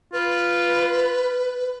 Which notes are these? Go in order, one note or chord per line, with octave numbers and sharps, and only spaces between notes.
F4 B4